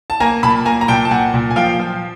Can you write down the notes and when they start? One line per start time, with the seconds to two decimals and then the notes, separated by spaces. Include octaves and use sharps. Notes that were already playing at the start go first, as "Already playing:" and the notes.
0.10 A5
0.20 A#3 G#5 A#5
0.43 A#2 A5 B5
0.65 A#3 G#5 A#5
0.81 A#5
0.88 A#2 G5 A5
1.05 A5
1.11 A#2 F#5 G#5
1.34 A#2
1.51 G#5
1.56 F3 F5 G5
1.79 F3